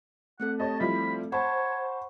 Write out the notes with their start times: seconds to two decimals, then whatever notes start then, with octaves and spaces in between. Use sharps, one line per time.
0.40 A3 C4 A4 F#5
0.60 G4 C#5 D#5 A5
0.80 F3 G3 E4 B5
1.32 C5 C#5 F#5 A5 B5 C#6